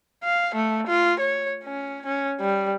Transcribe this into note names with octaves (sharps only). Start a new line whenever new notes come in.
F5
A3
F4
C#5
C#4
C#4
G3